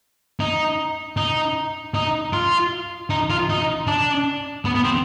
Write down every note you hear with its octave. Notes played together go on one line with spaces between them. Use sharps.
D#4
D#4
D#4
F4
D#4
F4
D#4
D4
B3
B3
C4